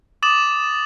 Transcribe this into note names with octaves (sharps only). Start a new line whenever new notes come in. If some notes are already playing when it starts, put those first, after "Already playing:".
D6 D#6 A6 E7 F#7